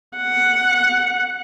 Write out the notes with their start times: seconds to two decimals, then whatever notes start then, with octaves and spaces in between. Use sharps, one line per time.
0.17 F#5